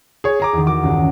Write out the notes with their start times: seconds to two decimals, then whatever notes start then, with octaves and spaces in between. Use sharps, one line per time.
0.24 G#4 C#5
0.40 G#4 A#5 D6
0.53 E2 D#3
0.67 F#4 A#4 D6
0.83 C#2 G2